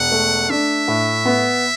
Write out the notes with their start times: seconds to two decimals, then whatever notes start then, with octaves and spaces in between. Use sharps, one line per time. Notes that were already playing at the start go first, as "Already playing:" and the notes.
Already playing: E1 F#5
0.11 A3
0.50 D4 E5
0.88 A2
1.25 B3